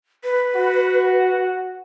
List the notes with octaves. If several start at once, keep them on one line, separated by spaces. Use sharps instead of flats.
B4
F#4